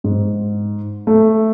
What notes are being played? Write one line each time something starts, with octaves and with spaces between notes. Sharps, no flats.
G#2
A3